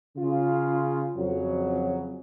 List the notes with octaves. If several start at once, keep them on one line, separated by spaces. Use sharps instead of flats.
C#3 F4
F2 C#3 F#3